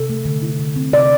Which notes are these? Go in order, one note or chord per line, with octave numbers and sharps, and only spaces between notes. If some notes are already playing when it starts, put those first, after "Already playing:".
Already playing: C3 A4
A3
D3
E4
D3
C4
C3 D5